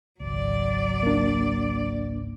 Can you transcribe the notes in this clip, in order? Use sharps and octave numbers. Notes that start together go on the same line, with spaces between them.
G#1 C#2 F#3 D5
A#3 D4